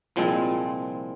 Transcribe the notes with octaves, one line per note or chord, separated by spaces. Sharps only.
C2 A#2 F3 G#3 C4